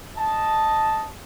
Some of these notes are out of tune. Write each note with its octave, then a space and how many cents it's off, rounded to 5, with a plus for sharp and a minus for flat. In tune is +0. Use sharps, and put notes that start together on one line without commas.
D#5 +0 A5 +0